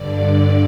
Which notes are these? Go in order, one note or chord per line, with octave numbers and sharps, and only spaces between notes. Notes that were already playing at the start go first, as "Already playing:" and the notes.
Already playing: G2 D3 D5